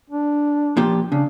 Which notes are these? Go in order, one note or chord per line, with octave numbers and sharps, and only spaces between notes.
D4
A#2 F3 G4
C#3 D4